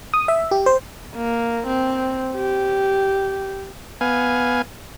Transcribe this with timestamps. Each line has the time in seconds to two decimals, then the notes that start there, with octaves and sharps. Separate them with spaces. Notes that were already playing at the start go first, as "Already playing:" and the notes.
0.14 D#6
0.28 E5
0.51 G4
0.66 C5
1.16 A#3
1.67 C4
2.36 G4
4.01 B3 F5 G#5